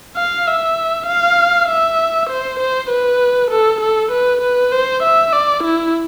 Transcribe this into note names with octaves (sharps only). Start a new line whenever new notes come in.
F5
E5
F5
E5
C5
C5
B4
A4
A4
B4
B4
C5
E5
D5
E4